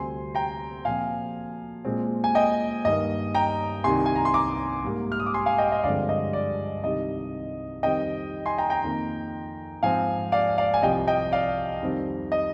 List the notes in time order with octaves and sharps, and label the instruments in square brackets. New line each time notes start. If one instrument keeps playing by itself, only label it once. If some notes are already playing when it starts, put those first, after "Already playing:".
Already playing: [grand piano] D2 C3 G3 C4 G#5 C6
G5 A#5
A#2 F3 C4 F5 G#5
A#2 G#3 C4
G#5
D#5 G5
G2 D#3 A#3 D#5
G5 A#5
C2 C3 D#3 G#5 C6
G#5
A#5
C6
A#5 D6
G#2 G3 A#3
F6
D#6
D6
G#5 C6
F5 G#5
D#5 G5
D#5
G2 D3 F3 G#3 C4 D5 F5
D#5
D5
C2 C3 D#3 G3 D#5
F2 D#3 G3 C4 D#5 G5
G#5 C6
G5 A#5
G5 A#5
F2 D#3 A#3
G#2 F3 C4 F5 G#5
D5 F5
D5 F5
G#5
C2 C3 F3 D#5 G5
D#5 G5
D5 F5
F2 D#3 G3 C4
D#5